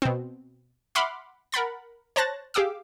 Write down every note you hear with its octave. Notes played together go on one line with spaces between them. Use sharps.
B2 C4
E5 F#5 B5 C6 D6 F6
A#4 F#5 B5 A6
C5 C#5 A5 F#6 A6 A#6
G4 G#4 F5 D6 E6